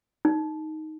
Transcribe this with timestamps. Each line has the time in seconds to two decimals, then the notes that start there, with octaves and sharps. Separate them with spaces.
0.25 D#4